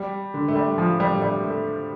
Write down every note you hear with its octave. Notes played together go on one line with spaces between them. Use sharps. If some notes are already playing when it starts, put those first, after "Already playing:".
Already playing: G3
D3
A3
G3
F3
G3
A3
G3
A3